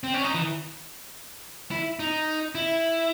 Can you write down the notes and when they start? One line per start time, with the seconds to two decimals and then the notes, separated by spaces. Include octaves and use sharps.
0.03 C4
0.14 C#4
0.24 D#4
0.34 E3
1.71 E4
1.99 D#4
2.55 E4